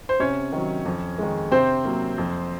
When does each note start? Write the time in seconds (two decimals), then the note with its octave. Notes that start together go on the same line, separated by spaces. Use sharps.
0.09 C5
0.20 C3 C#4 C#5
0.52 D#3 F#3
0.85 F2
1.18 D#3 G#3
1.51 C3 C4 C5
1.85 F#3 A#3
2.18 F2